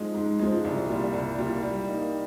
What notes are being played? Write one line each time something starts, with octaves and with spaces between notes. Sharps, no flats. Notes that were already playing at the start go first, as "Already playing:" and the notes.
Already playing: G#2 F3 G#3
G#2
F3 G#3
C2
A#2 G3
C2
A#2 G3
G3
A#3 D#4